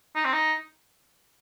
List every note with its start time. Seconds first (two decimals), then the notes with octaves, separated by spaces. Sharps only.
0.15 D#4
0.24 C4
0.33 D#4